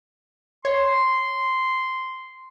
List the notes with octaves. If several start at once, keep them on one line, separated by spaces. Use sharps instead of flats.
C#5 C6